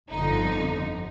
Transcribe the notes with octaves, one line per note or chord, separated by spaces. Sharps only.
G1 F2 D3 F3 D#4